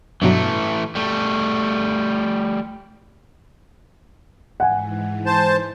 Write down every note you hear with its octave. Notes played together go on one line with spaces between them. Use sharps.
G2 B2 E3 F#3 A3
G3 A3
G#2 E3 F#5 G#5
C5 A5